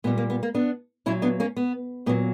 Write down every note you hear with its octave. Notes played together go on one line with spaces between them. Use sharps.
A#2 G3 B3
A#3
B3
A#3
B3 D4
A#2 F#3 C#4 E4
B3 D4
A#3 C#4
B3
A#2 F#3 B3